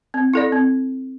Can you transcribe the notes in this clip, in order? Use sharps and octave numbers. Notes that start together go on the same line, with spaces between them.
C4
E4 A4 D5
C4